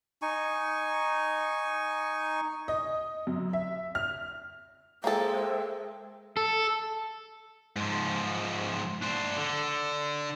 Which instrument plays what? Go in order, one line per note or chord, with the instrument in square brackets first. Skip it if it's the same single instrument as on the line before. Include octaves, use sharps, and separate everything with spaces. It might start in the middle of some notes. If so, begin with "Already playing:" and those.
[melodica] D#4 G#5 C#6
[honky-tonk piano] D#5
F#2
E5
F6
[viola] G#3 [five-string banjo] A#3 A4 [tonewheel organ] C5 E5 [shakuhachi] G5
[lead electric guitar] A4
[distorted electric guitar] G#2 F3
D4 C5
D3